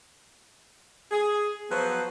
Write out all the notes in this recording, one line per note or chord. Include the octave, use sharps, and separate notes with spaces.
G#4
F3 F#3 B3 F#4 B4 C5